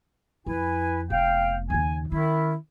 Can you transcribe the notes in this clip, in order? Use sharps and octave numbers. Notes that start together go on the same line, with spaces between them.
F2 E4 B4 G#5
F1 B3 F5 G5
D#2 C#3 G#5
D#3 C#4 E4